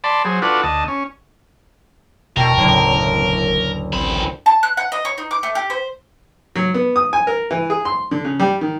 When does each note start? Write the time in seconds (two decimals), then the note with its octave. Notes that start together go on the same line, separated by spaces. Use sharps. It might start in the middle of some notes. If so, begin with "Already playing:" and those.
0.04 D5 A5 B5 C6
0.25 F#3 G#4 C5
0.42 D4 F4 F#4 A4 B4 F#5
0.63 D2 D#5 A5
0.88 C#4
2.37 E1 B2 A#4 G5 A5 C#6
2.58 F#1 D2 A2
3.93 A1 F#2 C4 B5
4.46 A5
4.63 F#6
4.77 F#5
4.92 D#5
5.05 C#5
5.18 D#4
5.31 D6
5.43 A3
5.55 G4
5.70 C5
6.56 F#3
6.74 B3
6.96 D#6
7.13 G#5
7.27 A#4
7.51 E3
7.70 G#4
7.85 C6
8.11 D3
8.25 C#3
8.40 G3
8.61 D#3